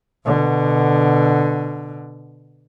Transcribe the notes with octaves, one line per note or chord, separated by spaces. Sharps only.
B2 D3